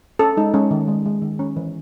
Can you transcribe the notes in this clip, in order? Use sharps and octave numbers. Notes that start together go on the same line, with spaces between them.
C#4 A4
G#3 D#4
G#3 C#4
D#3
G#3
G#3
D#3
C#4
E3